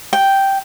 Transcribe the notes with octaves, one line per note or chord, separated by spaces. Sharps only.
G5